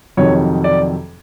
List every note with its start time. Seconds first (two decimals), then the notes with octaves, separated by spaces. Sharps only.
0.17 F2 C3 D#3 F#3 C#5
0.64 D5